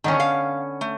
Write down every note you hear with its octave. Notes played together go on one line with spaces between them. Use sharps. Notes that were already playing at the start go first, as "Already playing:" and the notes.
D3 D#3 B3 C#4
F5
A3